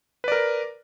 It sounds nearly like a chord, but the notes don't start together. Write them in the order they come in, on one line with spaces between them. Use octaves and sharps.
B4 D5 A#4